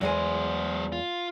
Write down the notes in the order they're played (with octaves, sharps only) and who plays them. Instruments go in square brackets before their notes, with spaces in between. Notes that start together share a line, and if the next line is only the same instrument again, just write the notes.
[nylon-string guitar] E2 G#3 G#5 [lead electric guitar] F#3 C5
[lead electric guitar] F4